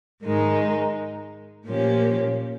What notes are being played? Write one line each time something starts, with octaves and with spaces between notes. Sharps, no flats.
G#2 D#3 G#3 D#4
A#2 F3 A#3 C#4 G4